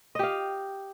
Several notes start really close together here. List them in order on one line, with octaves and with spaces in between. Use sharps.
D#5 G4 F5